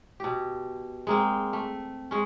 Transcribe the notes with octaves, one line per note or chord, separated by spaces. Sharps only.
B2 G4
G#3 A#3 C4
A3
G#3 C#4